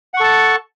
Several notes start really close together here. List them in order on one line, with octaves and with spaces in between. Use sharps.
F#5 C#6 A4 A5